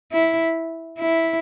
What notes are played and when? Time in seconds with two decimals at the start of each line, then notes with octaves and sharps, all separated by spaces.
0.12 E4
0.98 E4